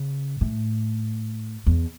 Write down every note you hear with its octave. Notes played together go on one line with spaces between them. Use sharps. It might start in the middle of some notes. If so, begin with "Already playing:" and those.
Already playing: C#3
A2
E2